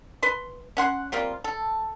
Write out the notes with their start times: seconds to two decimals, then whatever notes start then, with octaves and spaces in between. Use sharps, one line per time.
0.23 B4 C6
0.77 C#4 F#5 C6
1.12 G3 A#3 C4 F4
1.44 A4